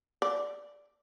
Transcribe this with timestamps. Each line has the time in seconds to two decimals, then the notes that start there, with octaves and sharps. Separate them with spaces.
0.22 D5